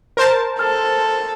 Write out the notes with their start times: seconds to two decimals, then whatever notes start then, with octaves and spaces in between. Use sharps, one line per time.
0.17 A#4 C5 A5
0.59 A4 F6